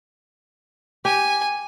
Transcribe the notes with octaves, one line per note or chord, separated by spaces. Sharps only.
G4 G#5